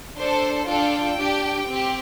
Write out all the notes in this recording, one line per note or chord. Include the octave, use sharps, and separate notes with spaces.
D4 A4 C5
D4 F4 A4 G5
D4 G4
C4 G4